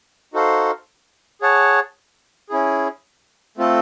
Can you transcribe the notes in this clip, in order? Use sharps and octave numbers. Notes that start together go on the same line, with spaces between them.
D#4 F#4 A4 C5 F5
G#4 C#5 F#5 A5
C#4 E4 G#4
A3 C4 F4 A4